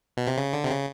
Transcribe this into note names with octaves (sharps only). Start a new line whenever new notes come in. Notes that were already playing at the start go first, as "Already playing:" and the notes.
B2
C3
C#3
D3
C3
C#3